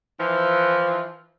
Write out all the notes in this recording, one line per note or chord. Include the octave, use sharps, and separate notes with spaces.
E3 F3